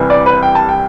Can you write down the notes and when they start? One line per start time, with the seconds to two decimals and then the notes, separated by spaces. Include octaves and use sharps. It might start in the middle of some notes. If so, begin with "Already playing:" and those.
Already playing: C2 C3 E3 G3
0.10 D5
0.26 B4
0.43 G5
0.55 A5
0.69 G5